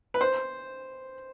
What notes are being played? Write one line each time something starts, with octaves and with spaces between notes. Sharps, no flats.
B4
C5